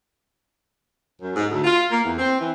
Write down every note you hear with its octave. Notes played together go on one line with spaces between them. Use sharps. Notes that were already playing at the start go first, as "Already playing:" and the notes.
F#2
G#2
D2
F4
A#3
E2
C4
E3